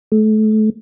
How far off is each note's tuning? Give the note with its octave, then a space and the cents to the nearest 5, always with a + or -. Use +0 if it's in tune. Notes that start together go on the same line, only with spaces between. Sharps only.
A3 -30